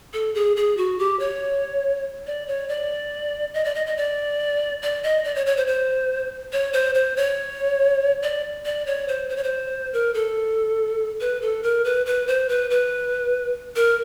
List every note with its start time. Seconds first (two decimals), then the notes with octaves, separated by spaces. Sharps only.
0.13 A4
0.35 G#4
0.56 G#4
0.77 F#4
0.99 G4
1.19 C#5
2.27 D5
2.48 C#5
2.69 D5
3.54 D#5
3.65 D5
3.75 D#5
3.86 D#5
3.97 D5
4.82 D5
5.03 D#5
5.24 D5
5.35 C#5
5.46 C#5
5.57 C5
5.67 C5
6.53 C#5
6.73 C5
6.95 C5
7.17 C#5
8.23 D5
8.65 D5
8.86 C#5
9.08 C5
9.29 C5
9.36 C#5
9.44 C5
9.93 A#4
10.14 A4
11.21 B4
11.42 A4
11.63 A#4
11.85 B4
12.06 B4
12.27 C5
12.49 B4
12.70 B4
13.76 A#4